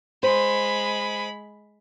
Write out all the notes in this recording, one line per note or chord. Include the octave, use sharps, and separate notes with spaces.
G#3 C5 B5